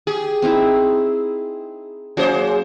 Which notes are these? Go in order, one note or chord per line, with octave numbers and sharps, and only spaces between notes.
G4 G#4
C4 D#4 E4
F#3 A#3 C#4 G#4 C5